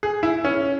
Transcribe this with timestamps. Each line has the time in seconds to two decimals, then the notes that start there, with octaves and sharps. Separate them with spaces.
0.03 G#4
0.23 E4
0.44 C#4